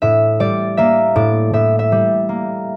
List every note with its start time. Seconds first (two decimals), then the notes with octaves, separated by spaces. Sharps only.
0.02 A2 E5
0.40 G3 D5
0.77 A#3 E5
1.16 A2 D5
1.53 A2 E5
1.79 E5
1.92 G3
2.29 A#3